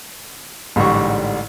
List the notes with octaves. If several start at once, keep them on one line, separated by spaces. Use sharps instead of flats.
A1 G#2 D3 G3 C#6